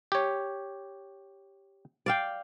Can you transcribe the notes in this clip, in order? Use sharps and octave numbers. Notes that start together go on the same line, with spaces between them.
G4 C#5
D5 F5 G5